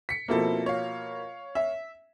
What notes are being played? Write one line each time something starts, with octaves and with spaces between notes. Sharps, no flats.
B6 C#7
B2 F3 A#3 C4 E4 A4
C#5 F5
E5